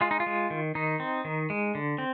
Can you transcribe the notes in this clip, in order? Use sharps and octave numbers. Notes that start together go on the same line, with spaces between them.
G#3 F4
D#4
F4
G#3
D#3
D#3 D#4
C4
D#3
G#3
D3
C4